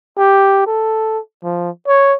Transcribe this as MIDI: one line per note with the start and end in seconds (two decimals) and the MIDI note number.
0.17 0.66 67
0.66 1.19 69
1.43 1.70 53
1.88 2.15 73